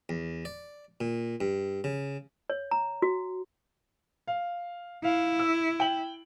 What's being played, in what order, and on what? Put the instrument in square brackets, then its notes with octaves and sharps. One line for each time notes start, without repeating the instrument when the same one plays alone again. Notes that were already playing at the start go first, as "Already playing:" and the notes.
[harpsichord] E2
D5
A#2
G2
C#3
[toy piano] C#5
A#5
F#4
[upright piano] F5
[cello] E4 [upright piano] F5
[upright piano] E6
G5 F#7